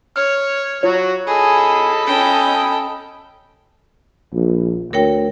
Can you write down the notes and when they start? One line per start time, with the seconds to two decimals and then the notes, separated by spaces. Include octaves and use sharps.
0.16 C#5 F6
0.83 F#3 F4 F#4 C#5
1.27 G#4 A4 D#5 B5
2.06 C#4 G5
4.34 A#1
4.93 D2 A#4 C#5 G5